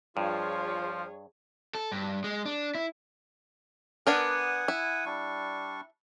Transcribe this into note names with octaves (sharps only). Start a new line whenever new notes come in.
G2 F3 F4 G#4 C#5
A4
G2
G#3
D4
E4
B3 D4 A#4 F#5 G#5 D#6
E4
G3 D4 C#6